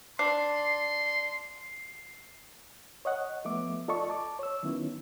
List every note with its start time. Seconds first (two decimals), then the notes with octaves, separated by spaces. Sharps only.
0.19 D4 C6 C7
3.05 C#5 D#5 F#5
3.45 F3 A3 B3 E5 D6
3.88 F4 A4 D5 D#5 A5 C#6
4.10 A5 D6
4.39 C#5 E6
4.63 D#3 F#3 B3 C#4 E4